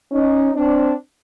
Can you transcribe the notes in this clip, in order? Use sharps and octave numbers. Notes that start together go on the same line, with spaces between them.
C#4 D#4
C4 D4